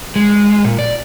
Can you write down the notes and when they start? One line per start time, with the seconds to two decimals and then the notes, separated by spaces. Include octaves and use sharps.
0.16 G#3
0.64 A#2
0.79 D5